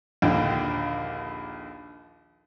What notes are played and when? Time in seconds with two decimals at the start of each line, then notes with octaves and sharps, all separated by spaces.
0.22 A#1 D#2 D3 G5